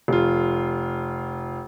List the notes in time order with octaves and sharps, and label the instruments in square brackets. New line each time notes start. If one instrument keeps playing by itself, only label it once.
[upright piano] F1 F4